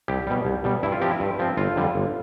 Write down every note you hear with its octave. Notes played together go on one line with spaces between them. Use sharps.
C2 G4
B2 G3
C2
B2 G3
G2 E4
F4
F3 C4 G4
E4
G2
F3 C4
G1 F4
F2 D3 G3
G1